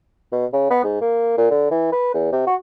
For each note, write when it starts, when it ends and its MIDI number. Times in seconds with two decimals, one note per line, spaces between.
0.32 0.46 47
0.53 0.66 49
0.70 0.81 59
0.84 0.98 44
1.01 1.37 58
1.38 1.49 46
1.51 1.68 50
1.71 1.89 52
1.92 2.11 71
2.14 2.32 40
2.33 2.44 48
2.47 2.55 66